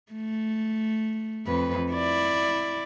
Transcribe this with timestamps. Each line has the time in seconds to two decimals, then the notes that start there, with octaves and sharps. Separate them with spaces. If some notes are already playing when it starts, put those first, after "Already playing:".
0.12 A3
1.46 F2 B4
1.92 E4 D5